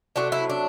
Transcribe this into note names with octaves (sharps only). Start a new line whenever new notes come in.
C3 F#3 A3 D4
E4
D4